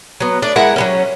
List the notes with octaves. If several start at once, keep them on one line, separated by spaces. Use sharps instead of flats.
F#3 B3
A3 D4 D5
G#3 E4 A#4 F#5
F#3 G3 C#4